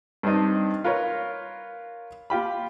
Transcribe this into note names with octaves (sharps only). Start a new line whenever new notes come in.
G2 C4 D4 D#4
F4 A#4 B4 C#5
F4 G4 B5